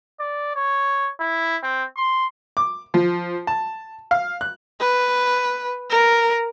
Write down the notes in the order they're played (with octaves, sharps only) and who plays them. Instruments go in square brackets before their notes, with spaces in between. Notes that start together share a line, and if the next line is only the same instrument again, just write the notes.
[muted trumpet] D5
C#5
E4
C4
C6
[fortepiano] D6
F3
A5
F5
F#6
[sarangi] B4
A#4